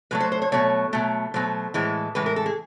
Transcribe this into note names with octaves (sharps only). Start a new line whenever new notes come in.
B2 F#3 A3 B4
C5
C5
C#5
B2 F#3 A3 C#5
B2 F#3 A3
B2 F#3 A3 C5
A2 E3 G#3
A2 E3 G#3 B4
A#4
A4
G#4